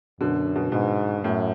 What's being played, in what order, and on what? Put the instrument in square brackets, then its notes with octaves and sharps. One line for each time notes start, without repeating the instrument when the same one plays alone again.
[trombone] F#2 [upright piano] B2 D3
[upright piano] B2
[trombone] G#2 [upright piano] B2
[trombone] F#2 [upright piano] A2